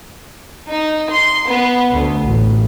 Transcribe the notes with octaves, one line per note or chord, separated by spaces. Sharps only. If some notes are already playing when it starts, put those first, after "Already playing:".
D#4
C6
B3
D2
A1